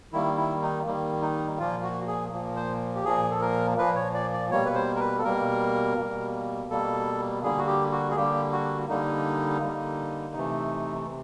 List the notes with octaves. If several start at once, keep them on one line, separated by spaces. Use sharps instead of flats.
D#3 G3 A#3 E4
E4
D#4
D#3 G3 A#3
D#4
A#2 F3 A#3 F4
F#4
G#4
A#2 F3 A#3
C5
G4
A#2 F3 A#3 G#4
A4
A#4
A#2 F3 A#3 B4
C#5
D5
D5
B2 G3 A#3 C#5
B4
C5
A#4
B4
A4
B2 G3 A#3 A#4
B2 G3 A#3
B2 G3 A#3 A4
D3 G3 A#3 G#4
F#4
G4
F#4
G#4
D3 G3 A#3 G4
F#4
D3 G3 A#3 D#4
D3 G3 A#3
C3 E3 A3
C3